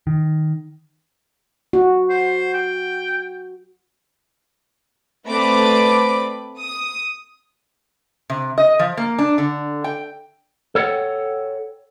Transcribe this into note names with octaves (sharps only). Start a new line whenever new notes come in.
D#3
F#4
C5
G5
A3 C4 B4 D5 B5 D6
D#6
C3
D#5
F3
A#3
D4
D3
G5
A4 C#5 D5 F#5 G5